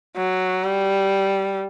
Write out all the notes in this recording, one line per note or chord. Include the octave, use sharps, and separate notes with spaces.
F#3
G3